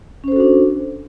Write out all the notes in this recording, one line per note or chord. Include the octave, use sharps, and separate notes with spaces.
C#4 D4 F#4 A4 C5